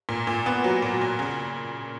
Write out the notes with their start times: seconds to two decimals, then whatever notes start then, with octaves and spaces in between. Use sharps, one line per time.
0.09 A#2
0.27 A#2
0.46 B3
0.64 F#3
0.82 A#2
1.01 A#2
1.19 C#3